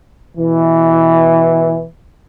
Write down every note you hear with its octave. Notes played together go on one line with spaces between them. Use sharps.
B2 E3